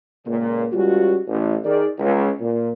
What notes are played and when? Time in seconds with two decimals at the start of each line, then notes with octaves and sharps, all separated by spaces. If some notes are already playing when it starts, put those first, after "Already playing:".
0.25 C#2 A#2
0.72 C#2 G3 F4 F#4
1.27 A1
1.64 D#3 D#4 G#4 D5
1.99 C#2
2.40 A#2